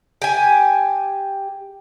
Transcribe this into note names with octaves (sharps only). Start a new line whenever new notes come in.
G4 G#5